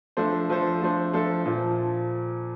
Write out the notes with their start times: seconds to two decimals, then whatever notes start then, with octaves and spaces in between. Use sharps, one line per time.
0.17 F3 A3 D4 A4 C5
0.50 F3 A3 D4 A4 C5
0.82 F3 A3 D4 A4 C5
1.13 F3 A3 D4 A4 C5
1.46 A#2 F3